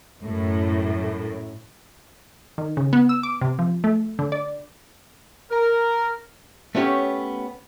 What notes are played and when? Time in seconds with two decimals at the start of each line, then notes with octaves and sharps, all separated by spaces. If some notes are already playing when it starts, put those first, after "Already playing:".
0.22 F#2 A2
2.58 D#3
2.77 C#3
2.93 B3
3.09 E6
3.23 D6
3.41 C3
3.59 F3
3.84 A3
4.19 D3
4.32 D5
5.51 A#4
6.75 A3 B3 C#4 G4 C#5